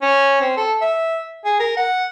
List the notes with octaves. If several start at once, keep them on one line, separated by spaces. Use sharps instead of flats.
C#4
C4
A4
E5
G#4
A#4
F#5